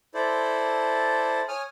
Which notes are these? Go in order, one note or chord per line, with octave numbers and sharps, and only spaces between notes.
E4 A4 C5 D5
C#5 G#5 D#6 F6